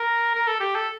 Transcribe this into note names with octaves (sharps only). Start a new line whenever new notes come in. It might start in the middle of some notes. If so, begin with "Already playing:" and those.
Already playing: A#4
A#4
A4
G4
A4